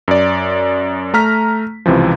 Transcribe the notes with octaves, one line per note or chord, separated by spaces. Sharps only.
F#2 D5
A3 A#5 F6 B6
C#2 C3 E3 F3